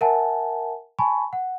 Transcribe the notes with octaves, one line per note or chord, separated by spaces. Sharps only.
A#4 E5 F#5 G#5 A5
G#5 A5 B5 C#6
F#5